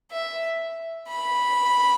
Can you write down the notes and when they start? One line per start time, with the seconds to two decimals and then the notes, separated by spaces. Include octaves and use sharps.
0.12 E5
1.08 B5